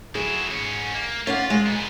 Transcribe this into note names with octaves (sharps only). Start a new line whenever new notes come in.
F#3 E4 G#4
G#2 C#4
A#3
C#4 F4 D5 F#5
G#3
A#2 B3